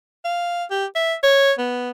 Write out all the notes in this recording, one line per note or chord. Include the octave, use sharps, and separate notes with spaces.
F5
G4
E5
C#5
B3